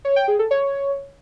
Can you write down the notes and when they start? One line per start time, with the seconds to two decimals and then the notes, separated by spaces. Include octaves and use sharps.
0.05 C#5
0.16 G5
0.28 G#4
0.39 A4
0.51 C#5